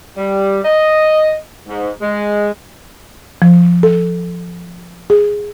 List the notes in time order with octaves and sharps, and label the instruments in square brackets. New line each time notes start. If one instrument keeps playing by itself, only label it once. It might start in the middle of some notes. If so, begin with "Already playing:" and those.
[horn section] G3
D#5
G#2
G#3
[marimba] F3
A4
G#4